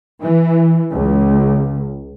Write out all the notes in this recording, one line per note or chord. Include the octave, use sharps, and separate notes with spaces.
E3
C#2